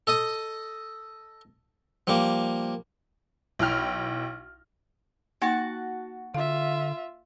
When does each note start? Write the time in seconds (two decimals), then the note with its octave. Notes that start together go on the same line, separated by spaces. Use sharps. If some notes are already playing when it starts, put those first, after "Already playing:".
0.07 A4 D#5 D#6
2.07 F3 G3 A#3
3.59 B1 E4 G5 F6
5.42 A#3 D#4 F#4 G5 A5
6.35 D3 F4 E5 F5